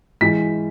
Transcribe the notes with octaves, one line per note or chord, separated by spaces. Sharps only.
E3 G#3 B6